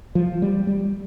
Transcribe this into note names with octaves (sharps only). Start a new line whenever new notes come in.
F3
G3
G3